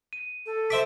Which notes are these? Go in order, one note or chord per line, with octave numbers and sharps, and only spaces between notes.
D#7
A4
C5 E5 D6 B6